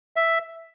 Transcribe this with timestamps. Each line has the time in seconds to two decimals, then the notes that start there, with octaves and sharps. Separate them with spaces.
0.16 E5